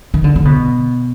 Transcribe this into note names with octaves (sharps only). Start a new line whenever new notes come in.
D#3
D3
D3
B2